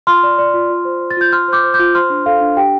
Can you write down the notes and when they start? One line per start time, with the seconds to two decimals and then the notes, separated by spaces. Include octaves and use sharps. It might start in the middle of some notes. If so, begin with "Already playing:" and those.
0.07 F4 C6 F6
0.23 D5
0.38 D5
0.54 F4
0.70 F4
0.85 C5
1.01 C5
1.11 A6
1.17 F4 G6
1.32 F4 C6 F6
1.48 C5 D6 G6
1.64 C5
1.74 D6 G6
1.79 F4
1.95 C5 C6 F6
2.10 D4
2.26 A4 F5
2.41 D4
2.57 G4 G5